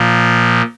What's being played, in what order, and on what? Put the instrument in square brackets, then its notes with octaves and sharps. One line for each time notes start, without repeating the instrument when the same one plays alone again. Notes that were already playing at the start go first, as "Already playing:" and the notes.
Already playing: [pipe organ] A#2 F3